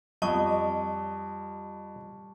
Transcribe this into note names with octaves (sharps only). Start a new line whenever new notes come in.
F2 G3 D#5 A5 C#6 D6